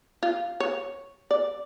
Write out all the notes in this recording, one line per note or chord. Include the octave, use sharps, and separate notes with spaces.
F4
C#5
D5